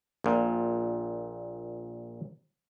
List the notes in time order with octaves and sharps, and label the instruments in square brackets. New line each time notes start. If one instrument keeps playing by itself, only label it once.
[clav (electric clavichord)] A#1 A#2